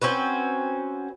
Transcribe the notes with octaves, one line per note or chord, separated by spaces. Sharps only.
C4 C#4 F#4 B4